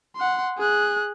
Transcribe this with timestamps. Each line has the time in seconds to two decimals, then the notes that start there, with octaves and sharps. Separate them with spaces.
0.16 F#5 C6
0.58 G#4 F#6